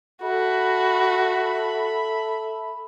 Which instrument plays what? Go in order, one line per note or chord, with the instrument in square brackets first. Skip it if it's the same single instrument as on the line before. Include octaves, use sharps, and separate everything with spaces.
[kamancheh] F#4 [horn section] A4 E5 B5